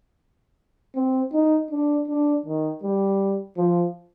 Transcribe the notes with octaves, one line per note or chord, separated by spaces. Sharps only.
C4
D#4
D4
D4
D#3
G3
F3